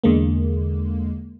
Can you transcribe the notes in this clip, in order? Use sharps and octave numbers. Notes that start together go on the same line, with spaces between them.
E2 D3 G#3 A#3